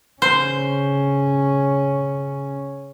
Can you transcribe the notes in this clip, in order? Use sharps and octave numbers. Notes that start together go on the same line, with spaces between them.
C#3 C#4 C5